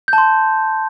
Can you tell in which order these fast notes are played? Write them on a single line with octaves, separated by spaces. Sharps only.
G6 A5 C6